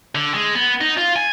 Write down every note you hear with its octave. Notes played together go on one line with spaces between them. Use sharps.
D3
G#3
B3
D#4
F4
G#5